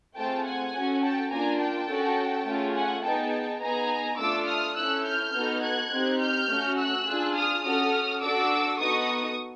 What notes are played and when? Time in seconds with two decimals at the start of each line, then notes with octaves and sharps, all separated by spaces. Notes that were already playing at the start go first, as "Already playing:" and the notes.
0.16 A3 C4 F4 G#4 G5 A5
0.44 F#5 G#5
0.74 C#4 F#4 A4
1.02 G5 A5
1.30 A#3 D4 F4 G#5 A#5
1.60 G5 A5
1.88 C#4 F#4 A4
2.46 A3 C#4 F4 G#4
2.74 F#5 G#5
3.03 B3 D#4 G#4 G5 A5
3.61 B3 D#4 G#4 G#5 A#5
4.18 A3 D4 F4 A4 D6 E6
4.47 D#6 F6
4.76 C#4 E4 A4 E6 F#6
5.04 F6 G6
5.33 B3 D#4 F#4 A4
5.62 F#6 G#6
5.91 C4 D#4 G4
6.19 F6 G6
6.48 A3 C#4 F#4
6.77 E6 F#6
7.06 D4 F4 G#4
7.34 D#6 F6
7.64 C#4 F#4 A4 D#6 F6
8.21 D4 F#4 A4 D6 E6
8.79 B3 D#4 F#4 A4 C#6 D#6